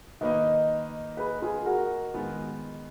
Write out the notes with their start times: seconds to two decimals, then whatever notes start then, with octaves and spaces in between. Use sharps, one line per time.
0.21 D#3 A#3 D#4 B4 D#5
1.17 G#4 B4
1.42 F4 G#4
1.65 F#4 A#4
2.14 D#3 G#3 B3 F4